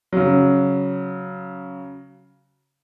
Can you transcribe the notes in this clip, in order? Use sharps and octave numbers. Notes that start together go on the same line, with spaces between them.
C#3 F#3